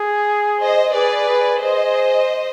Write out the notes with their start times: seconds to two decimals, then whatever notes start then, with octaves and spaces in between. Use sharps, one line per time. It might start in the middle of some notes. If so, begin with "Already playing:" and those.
Already playing: G#4
0.61 C5 D#5
0.94 G#4 B4 D5
1.28 G#4
1.62 G#4 C5 D#5